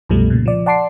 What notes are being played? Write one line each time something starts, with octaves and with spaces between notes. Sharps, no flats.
C2 F#2 B2 F3 G3 A3
A#2 C#3
F3 D5
D5 F#5 A5 C6 D6 C7